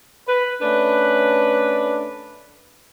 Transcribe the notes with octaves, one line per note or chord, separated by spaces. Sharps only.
B4
A3 C#4 D4 B4